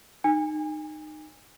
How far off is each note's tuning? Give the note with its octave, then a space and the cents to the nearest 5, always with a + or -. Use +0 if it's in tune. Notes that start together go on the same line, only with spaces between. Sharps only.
D#4 -20 G#5 -30